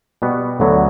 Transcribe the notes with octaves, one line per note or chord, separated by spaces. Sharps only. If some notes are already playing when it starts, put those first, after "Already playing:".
B2 G3 B3 F#4
D2 D3 F#3 B3